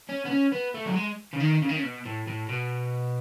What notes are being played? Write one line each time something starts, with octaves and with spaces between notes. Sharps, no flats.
C#4
B3
C#4
B3
A3
F#3
G#3
C#3
D#3
C#3
D#3
C#3
B2
A2
A2
B2